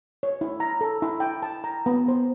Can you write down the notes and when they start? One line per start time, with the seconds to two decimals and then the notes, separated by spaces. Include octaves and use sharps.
0.23 C#5
0.41 E4
0.60 A#5
0.81 A4
1.02 E4
1.20 G5
1.43 A5
1.64 A#5
1.86 B3
2.08 C5